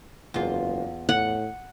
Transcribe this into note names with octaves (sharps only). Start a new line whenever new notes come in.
F#1 E2 F4
A2 F#5